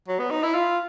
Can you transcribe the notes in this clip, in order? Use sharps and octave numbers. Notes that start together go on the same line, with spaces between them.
F#3
B3
D#4
E4
F4